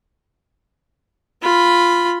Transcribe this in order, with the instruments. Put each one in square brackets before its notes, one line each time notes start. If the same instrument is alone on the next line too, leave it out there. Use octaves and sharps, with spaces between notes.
[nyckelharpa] F4 B5